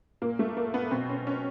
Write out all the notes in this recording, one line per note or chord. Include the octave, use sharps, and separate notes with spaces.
A#2 A#3
A3
A#3
B3
B2 C4
C#4
C#4